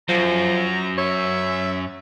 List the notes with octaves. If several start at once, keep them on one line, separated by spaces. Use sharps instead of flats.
F#2 F3 A#5
C#5 E5